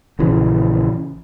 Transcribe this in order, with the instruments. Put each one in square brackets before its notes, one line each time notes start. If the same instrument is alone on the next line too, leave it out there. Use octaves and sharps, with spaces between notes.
[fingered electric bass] A#1 C#3 E3